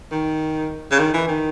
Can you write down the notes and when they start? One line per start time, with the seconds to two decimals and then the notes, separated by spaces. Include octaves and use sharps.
0.11 D#3
0.91 C#3
0.99 D#3
1.14 E3
1.28 D#3